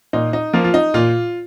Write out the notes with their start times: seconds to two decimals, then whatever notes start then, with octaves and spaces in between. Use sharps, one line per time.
0.13 A#2 D#4
0.33 D#4
0.53 F3 A#3 F4
0.64 F4
0.74 D#4
0.94 A#2 F4